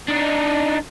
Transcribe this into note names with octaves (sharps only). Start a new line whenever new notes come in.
D4 D#4